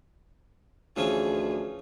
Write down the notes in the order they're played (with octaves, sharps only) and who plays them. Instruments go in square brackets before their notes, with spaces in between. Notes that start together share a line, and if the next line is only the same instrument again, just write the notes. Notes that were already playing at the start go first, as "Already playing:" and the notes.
[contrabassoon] D2 [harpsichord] E3 F3 C#4 [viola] G#4